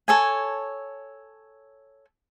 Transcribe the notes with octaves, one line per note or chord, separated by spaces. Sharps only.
A4 C#5 G#5